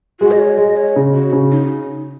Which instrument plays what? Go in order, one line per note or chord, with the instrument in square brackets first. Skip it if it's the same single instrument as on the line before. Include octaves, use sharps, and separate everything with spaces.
[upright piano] G#3 [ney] F#4
[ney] D#5
C#5
[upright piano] G#3 [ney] D#5
[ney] C#5
[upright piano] C#3
[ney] F#4
[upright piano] C#3
[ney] D#4